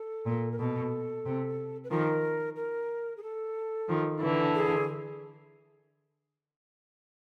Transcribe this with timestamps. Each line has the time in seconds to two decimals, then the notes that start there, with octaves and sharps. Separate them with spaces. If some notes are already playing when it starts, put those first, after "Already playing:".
Already playing: A4
0.25 A#2
0.52 A#4
0.59 B2 A4
1.25 C3
1.84 B4
1.90 D#3 F3 A#4
2.56 A#4
3.17 G#4
3.23 A4
3.88 D#3 F3
4.22 D3 E3
4.55 G#4